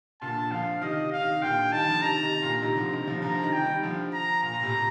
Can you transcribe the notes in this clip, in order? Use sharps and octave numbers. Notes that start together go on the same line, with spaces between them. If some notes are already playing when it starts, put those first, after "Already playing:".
A#2 D3 A5
D3 F3 F5
C3 D#3 D#5
F5
C3 D#3
A#2 D3 G5
D#3 G3 A5
D3 F3
C3 D#3 A#5
C3 D#3
A#2 D3
C3 D#3 A#5
D3 F3
C3 D#3
D3 F3
D3 F3 A#5
C3 D#3
G5
D#3 G3
D3 F3
A#5
A#2 A#5
A#2
A2 C3